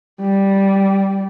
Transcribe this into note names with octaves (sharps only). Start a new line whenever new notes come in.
G3